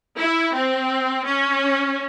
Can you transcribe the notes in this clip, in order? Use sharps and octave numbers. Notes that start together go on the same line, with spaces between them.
E4
C4
C#4